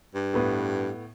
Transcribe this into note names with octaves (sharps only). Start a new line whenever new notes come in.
G2
A2 B3